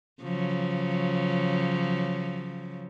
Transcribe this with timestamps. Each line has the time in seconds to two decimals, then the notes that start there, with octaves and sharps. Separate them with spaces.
0.23 C#3 F3 F#3